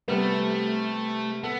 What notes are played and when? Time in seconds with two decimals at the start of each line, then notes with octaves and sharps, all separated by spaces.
0.08 C3 G3 A3 B3
1.43 B3 A4